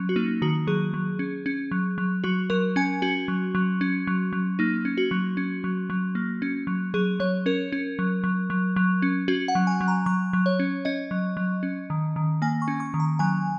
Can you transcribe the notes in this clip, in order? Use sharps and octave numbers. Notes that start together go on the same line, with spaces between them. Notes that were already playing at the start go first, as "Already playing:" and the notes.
Already playing: F#3 C#4
F#4
A#3 D#4
D#3 F#4
F#3 G#4
F#3
C#4
C#4
F#3
F#3
F#3 F#4
F#3 A#4
C#4 G#5
C#4 F#4
F#3
F#3
C#4
F#3
F#3
A#3 D#4
C#4
F#4
F#3
C#4
F#3
F#3
A#3
C#4
F#3
F#3 G#4
F#3 C#5
C#4 A#4
C#4
F#3
F#3
F#3
F#3
C#4
C#4 F#4
F#5
F#3
G#5
F#3
A#5
F#3 C#6
F#3
C#5
C#4
C#4 D#5
F#3
F#3
C#4
D#3
D#3
A#3 G#5
C#6
C#4
C#6
D#3
A#5
F#3 G#5